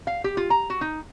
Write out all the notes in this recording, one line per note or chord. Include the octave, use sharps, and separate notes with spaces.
F5
G4
F4
A#5
F#4
D#4